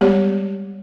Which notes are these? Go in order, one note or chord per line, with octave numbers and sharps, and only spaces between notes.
G3 G#3 B3 G4 C#5 D5